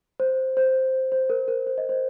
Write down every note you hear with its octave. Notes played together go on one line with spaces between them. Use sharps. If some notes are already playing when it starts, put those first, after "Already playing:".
C5
C5
C5
A#4
A#4
C5
D#5
C5